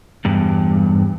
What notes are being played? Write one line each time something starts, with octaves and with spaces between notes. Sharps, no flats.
E2 G2